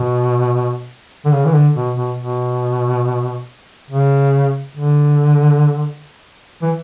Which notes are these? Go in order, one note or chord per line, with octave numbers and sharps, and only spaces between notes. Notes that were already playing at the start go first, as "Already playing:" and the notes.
Already playing: B2
D3
C#3
E3
D3
B2
B2
B2
C#3
D3
E3